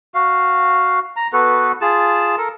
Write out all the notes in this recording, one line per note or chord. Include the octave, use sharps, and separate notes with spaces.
F#4 F5
A#5
B3 F#4 A4 B4
F4 G#4 A5
A4 A#4